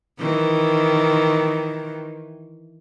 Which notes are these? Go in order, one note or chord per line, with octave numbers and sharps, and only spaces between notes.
D#3 E3